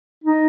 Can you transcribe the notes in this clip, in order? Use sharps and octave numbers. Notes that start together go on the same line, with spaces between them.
D#4